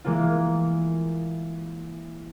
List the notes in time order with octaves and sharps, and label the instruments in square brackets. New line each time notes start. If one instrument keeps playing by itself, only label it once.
[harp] E3 G#3 A#3 F4